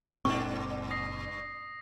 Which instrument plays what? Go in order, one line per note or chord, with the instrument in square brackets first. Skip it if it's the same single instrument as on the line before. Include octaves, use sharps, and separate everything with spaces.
[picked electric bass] F#1 A#2 C4 [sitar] G2 D4 [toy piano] C#6
[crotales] D#6 A#6 C7